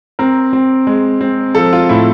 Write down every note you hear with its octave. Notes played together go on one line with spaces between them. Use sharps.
C4 A#4
C4
G#3
C4
F3 A4
F4
A2 E4